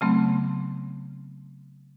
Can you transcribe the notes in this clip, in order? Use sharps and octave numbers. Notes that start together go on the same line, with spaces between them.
C#3 F#3 A3 B3 C4